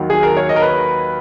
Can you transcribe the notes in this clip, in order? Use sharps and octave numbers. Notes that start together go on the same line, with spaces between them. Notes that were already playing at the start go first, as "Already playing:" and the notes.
Already playing: D#2 D#3 F#3
G#4
A#4
C#5
D#5
A#4
B4